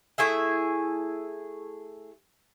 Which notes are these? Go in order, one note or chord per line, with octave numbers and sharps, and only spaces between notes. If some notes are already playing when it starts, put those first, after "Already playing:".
A3 E4 G#4 E5